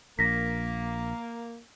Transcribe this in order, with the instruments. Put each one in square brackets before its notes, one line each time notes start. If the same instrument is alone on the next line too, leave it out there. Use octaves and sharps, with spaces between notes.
[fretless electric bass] A#1 [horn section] A#3 [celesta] A#6 B6